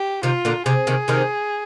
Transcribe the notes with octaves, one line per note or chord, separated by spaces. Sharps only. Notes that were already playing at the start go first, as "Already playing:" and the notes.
Already playing: G4
C3 D#3 F4
A#2 D3
C3 G#4
C3 D#3
C3 D#3